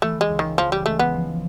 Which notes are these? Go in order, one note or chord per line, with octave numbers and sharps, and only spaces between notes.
E3 A3
G#3
C#2
D#3
E3 F3
G3
G#3 A3
B3
F3